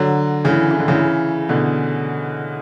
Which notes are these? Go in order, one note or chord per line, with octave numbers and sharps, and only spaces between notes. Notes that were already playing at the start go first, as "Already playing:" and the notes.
Already playing: D3 F#3
C#3 E3
E3
D3
C#3 E3
B2 D3